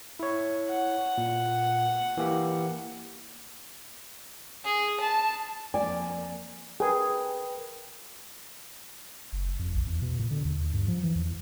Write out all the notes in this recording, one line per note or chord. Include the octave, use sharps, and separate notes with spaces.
E4 C#5
F#5
A#2
E3 A#3 G4
G#4
A5
F2 A#3 D5 G#5
G#4 A#4 B4 G5
F#1
F2
A#1
E2
B2
A#2
D3
D#2
G2
F3
E3
E2